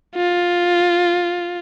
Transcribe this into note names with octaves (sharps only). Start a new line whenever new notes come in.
F4